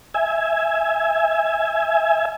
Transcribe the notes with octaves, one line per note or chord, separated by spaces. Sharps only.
E5 G#5